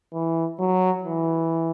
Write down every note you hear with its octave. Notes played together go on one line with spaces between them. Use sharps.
E3
F#3
E3